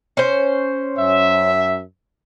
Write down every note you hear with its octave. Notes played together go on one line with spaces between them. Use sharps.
C#4 C5
F#2 E5